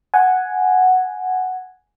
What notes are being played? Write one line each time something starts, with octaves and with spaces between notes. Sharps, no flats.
F#5 G#5